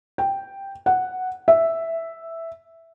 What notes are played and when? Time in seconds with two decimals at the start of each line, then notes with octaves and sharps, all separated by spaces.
0.18 G5
0.86 F#5
1.48 E5